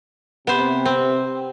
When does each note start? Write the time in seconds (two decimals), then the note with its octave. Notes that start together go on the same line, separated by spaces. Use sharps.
0.47 C3 B3 C5
0.85 C4